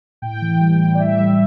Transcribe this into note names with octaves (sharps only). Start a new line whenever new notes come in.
A2 G5
E3
G3
G3
D5
A2 E5
G3